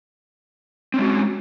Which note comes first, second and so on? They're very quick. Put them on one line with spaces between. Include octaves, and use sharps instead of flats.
C4 C#4 G#3 F#4